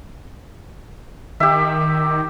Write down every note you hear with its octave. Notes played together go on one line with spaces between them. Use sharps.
D#3 G4 E5